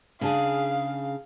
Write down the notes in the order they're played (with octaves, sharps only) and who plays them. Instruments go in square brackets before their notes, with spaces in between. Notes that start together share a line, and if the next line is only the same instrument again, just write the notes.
[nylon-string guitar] C#3 D4 G#4 [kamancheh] F5